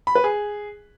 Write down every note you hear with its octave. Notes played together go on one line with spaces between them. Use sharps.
B5
B4
G#4